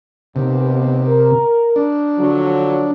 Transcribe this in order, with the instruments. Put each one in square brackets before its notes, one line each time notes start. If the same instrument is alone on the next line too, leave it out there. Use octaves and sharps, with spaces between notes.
[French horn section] D#2 B3 [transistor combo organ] C3
[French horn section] A#4
[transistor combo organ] D4
[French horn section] D3 F3 F#3